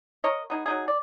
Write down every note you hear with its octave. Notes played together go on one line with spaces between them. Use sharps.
A#4 C#5 D#5
B3 D#4 G#4
F#3 D#4 G#4
D5